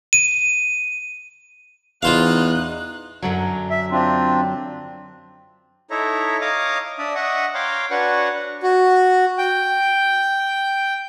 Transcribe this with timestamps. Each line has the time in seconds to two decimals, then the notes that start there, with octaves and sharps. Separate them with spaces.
0.13 D#7
2.03 E2 D#4 F4 C5 F5 F#6
3.22 F#2 D3 F#3
3.71 E5
3.91 C4 D4 F4
5.90 D#4 E4 A4 C#5 E5 A#5
6.41 C#5 D#5 F5 A#5 D6 D#6
6.98 D4 D5 E5 D#6
7.15 D#5 E5 F#5 C#6 D#6
7.54 C#5 F5 G5 A#5 C6 D6
7.91 D4 F#4 B4 C#5 F#5 C#6
8.63 F#4
9.38 G5